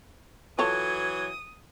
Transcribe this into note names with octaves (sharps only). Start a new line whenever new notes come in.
E3 F#3 F4 A4 C#5 D#6 G#6